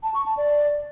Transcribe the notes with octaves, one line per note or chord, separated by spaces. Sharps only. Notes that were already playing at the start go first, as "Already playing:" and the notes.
A5
C#6
A5
D5